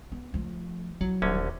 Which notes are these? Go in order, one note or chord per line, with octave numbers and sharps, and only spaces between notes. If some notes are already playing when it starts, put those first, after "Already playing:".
B3
F3 A3
F#3 E4
D#1 C2 D3 C#4